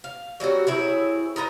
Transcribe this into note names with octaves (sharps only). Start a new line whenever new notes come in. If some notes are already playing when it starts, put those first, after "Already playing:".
F5
F#3 G3 C4 F#4
C4 E4 G#4 C#5
D#4 F4 B4 A#5